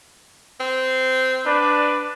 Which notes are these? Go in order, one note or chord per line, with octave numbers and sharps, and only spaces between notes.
C4
D4 B4 D5